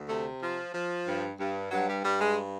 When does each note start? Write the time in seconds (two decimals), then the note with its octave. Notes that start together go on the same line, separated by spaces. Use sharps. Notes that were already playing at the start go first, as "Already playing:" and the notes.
Already playing: D2
0.09 C3 A3
0.42 F3
0.74 F3
1.07 G2
1.39 G2
1.71 G2 F#3
1.88 G3
2.05 G2 G3
2.20 G#3